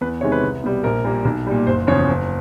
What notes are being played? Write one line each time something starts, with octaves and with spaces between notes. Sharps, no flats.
E2 B4
C3 D#3 G#3 C#5
B4
C2
B2 G3
A#1 A#4
A#2 G3 A#3
B1
A#2 G3
F#1 C5
E2 C#3 F3 C#5
F#1